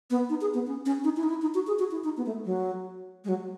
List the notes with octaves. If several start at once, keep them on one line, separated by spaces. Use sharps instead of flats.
B3
D#4
G#4
B3
C#4
C#4
D#4
E4
D#4
E4
D#4
F#4
G#4
F#4
E4
D#4
B3
A3
F#3
G#3
F#3